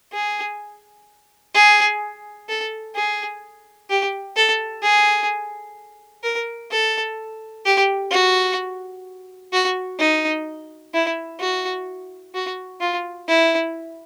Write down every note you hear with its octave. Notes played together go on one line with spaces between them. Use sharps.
G#4
G#4
A4
G#4
G4
A4
G#4
A#4
A4
G4
F#4
F#4
D#4
E4
F#4
F#4
F4
E4